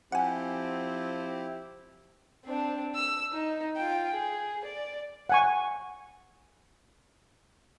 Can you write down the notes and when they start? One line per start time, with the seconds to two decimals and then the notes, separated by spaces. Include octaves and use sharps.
0.12 F3 C4 E4 G4 F#5 G#5
2.45 C4 D4
2.95 E6
3.33 D#4
3.76 F4 G5
4.13 G#4
4.65 D5
5.29 F#5 G#5 C#6